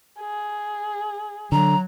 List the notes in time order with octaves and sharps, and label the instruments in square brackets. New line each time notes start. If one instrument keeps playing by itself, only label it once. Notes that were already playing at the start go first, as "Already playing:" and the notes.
[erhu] G#4
[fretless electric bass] D3 [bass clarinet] F#3 [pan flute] A#5